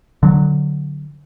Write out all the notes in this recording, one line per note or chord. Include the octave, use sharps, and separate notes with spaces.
D3 F#3